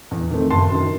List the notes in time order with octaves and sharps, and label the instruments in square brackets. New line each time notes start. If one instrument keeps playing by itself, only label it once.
[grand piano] E2
D#3 A3 C4
F#1 A5 C6
F#2 D#3